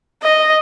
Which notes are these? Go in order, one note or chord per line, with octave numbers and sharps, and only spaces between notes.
D#5